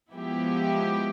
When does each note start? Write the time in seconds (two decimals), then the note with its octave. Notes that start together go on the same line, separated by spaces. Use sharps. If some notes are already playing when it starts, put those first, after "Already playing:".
0.12 F3 G#3 B3 E4 G4